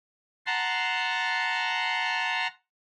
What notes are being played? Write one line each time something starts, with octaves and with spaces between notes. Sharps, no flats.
F#5 A5 A#5 C6